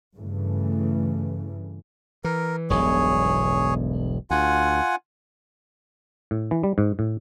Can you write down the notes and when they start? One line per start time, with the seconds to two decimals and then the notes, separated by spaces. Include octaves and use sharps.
0.16 G2 C#3 E3 A3
2.24 E3 A#4
2.70 E1 B1 G2 G#4 C#5
4.31 D2 F4 F#5 G#5
6.31 A2
6.51 E3
6.64 G3
6.78 G#2
6.99 A2